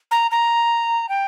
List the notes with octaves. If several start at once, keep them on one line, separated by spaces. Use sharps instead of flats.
A#5
A#5
G5